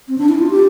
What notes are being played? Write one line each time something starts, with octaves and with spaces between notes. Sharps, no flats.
C4
D4
E4
F4
G4